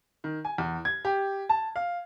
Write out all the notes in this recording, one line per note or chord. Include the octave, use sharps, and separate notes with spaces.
D#3
G#5
E2
G#6
G4
A5
F5